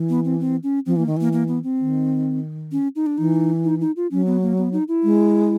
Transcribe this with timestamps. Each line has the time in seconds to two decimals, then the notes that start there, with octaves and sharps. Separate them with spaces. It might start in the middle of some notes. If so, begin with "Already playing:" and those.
Already playing: E3
0.09 B3
0.25 C4
0.40 C4
0.63 C#4
0.86 F3 C4
0.96 E3 A#3
1.06 D#3
1.17 E3 A#3
1.33 A#3
1.48 B3
1.64 C4
1.80 D#3
2.72 C#4
2.96 D#4
3.06 D4
3.18 E3 D#4
3.64 D#4
3.81 D#4
3.96 F4
4.11 F#3 C#4
4.26 B3
4.42 A#3
4.58 B3
4.73 D#4
4.88 E4
5.04 G#3